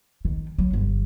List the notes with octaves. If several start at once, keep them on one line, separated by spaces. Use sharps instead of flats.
D#3
F#3
G1